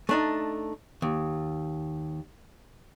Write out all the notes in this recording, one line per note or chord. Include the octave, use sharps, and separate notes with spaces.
A3 D4 D#4
D#2